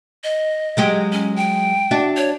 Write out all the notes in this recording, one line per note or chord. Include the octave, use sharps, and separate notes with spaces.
D#5
F#3 G#3 G4
C#4
G5
D4 F#4 E5
C#5